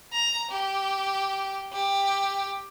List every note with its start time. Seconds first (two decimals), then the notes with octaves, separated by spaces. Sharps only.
0.12 A#5
0.50 G4
1.73 G4